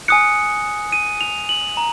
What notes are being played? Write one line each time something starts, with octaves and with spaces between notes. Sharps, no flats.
G#5 D#6 F#6 C#7
D#7
F7
F#7
A#5